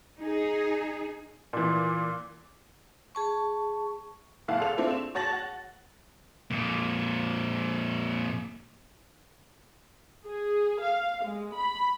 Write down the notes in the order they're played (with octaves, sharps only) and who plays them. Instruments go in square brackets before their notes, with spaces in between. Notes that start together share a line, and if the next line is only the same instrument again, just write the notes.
[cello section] D#4 G#4
[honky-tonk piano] A#2 E3
[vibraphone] G#4 A5 C#6
[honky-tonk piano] F#1 A#2 E4 F5 F#5 A5
A4 F7
A3 C4 D4 E4 F4
E7
F#4 C#5 A5 A6 A#6 F#7
F#5
[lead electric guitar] F2 A#2
[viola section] G#4
F5
G#3
B5